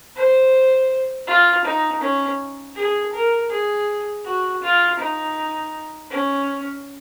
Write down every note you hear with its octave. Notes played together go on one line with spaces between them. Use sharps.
C5
F4
D#4
C#4
G#4
A#4
G#4
F#4
F4
D#4
C#4